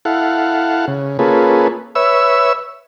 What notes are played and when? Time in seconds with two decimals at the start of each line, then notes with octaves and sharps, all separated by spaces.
0.05 E4 A4 F5 F#5
0.87 C#3
1.19 A#3 C#4 F4 G#4 A4 B4
1.95 B4 C#5 E5 E6